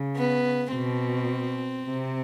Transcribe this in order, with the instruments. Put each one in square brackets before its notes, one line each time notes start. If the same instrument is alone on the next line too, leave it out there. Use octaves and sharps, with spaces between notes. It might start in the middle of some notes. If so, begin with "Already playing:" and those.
Already playing: [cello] C#3
[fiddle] B3
[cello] B2 [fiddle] C4
[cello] C3